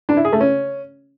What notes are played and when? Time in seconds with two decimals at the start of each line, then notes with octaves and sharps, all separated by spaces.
0.09 D4
0.17 E4
0.25 G#4
0.33 A3
0.41 C#4